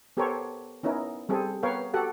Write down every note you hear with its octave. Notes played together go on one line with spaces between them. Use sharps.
B3 G4 A4 A#4 C5 C#5
B3 C#4 D#4 E4 A#4
G3 C4 G#4 A4
B3 A#4 B4 C#5 F5 G5
F#4 G4 A4 F#5